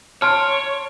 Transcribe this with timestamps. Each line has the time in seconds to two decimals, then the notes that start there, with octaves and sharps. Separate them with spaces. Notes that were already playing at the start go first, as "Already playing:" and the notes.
0.22 C#5 A5 C6 F6 D7